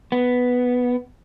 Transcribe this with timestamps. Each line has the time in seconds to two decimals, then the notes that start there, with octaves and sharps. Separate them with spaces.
0.12 B3